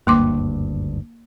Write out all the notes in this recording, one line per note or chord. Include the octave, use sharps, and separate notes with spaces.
F#1 D2 G2 A#3 C6 D6